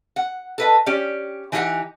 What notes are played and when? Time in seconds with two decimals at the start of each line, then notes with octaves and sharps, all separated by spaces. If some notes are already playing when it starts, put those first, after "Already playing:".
0.16 F#5
0.58 A4 B4 D#5
0.86 C#4 G4 D5
1.52 E3 D#4 G4 G#4 F#5 G#5